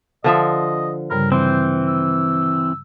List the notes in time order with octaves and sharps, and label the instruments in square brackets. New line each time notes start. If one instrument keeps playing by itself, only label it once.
[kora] D3 F3 E5 [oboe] D#5 [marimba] A5 D#6
[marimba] G2 C#3 G3 [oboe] A#4
[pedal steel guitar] E3 C4 [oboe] C5
[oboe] E6